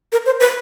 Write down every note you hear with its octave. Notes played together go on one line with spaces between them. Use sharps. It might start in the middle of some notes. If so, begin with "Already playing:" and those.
A#4
C5
B4